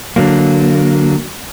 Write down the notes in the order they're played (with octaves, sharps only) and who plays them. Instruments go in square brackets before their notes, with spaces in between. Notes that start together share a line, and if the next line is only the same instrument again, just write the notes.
[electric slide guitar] D3 F#3 A#3